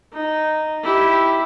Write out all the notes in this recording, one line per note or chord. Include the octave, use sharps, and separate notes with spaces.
D#4
E4 G4